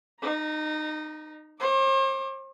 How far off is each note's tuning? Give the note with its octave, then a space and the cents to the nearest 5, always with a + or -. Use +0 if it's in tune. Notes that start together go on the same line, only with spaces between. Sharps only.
D#4 -20 A#5 +25
C5 +45 D6 +0